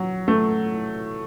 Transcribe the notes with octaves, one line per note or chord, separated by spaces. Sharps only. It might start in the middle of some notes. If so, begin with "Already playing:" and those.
Already playing: F#3
A3